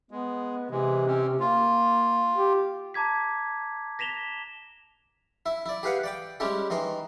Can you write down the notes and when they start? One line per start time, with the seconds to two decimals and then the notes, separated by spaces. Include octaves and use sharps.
0.11 G#3 B3
0.70 C3 E3 G#3
1.07 C4 C#4
1.40 A#3 F4
2.36 G4
2.94 A5 A#5 D6 G#6 B6
3.99 A#6 B6 E7 F7 G7
5.46 E4 E5
5.66 E4 D5
5.83 G4 G#4 B4 F5 F#5
6.04 D5 G5 D6
6.40 G3 G#3 C#4 E4 G4
6.70 D#3 E3 D#5 C6